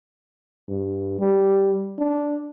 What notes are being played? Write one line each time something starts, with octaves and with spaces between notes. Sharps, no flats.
G2
G3
D4